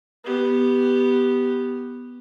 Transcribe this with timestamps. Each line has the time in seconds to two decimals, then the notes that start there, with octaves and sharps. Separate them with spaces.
0.24 B3 G4